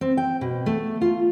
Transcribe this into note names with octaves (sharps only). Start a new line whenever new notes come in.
C4
G5
B2
A3
F4